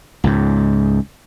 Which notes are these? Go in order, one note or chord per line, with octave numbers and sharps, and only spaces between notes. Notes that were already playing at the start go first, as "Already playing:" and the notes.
C#2 G#2